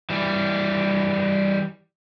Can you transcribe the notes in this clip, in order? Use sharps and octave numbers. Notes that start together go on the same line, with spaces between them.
E3 G3